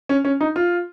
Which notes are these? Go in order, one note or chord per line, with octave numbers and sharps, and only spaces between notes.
C#4
C#4
D#4
F4